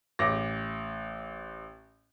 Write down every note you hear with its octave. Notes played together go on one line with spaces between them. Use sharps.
A1 D6 A#6